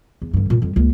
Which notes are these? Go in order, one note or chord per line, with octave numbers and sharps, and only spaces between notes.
E2
G2 D3
F2 A#2
F2 G3
C#2 A#3